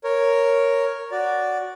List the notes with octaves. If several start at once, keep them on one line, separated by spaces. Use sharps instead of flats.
A#4 C#5
F#4 D5